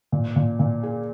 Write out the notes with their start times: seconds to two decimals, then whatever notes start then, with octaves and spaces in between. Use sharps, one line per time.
0.12 A#2
0.36 A#2
0.59 A#2
0.83 G#4